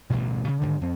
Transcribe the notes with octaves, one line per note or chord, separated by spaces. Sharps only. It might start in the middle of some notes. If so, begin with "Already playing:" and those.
A1 D2 G2 B2
C#3
G#2 B2 D3 D#3
F2 C4